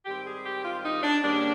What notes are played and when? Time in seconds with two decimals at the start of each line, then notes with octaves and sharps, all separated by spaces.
0.05 G#2 D#3 G3 C4 G4
0.25 G#4
0.44 G4
0.63 F4
0.84 D#4
1.02 D4
1.22 G#2 D#3 G3 A#3 C#4 D4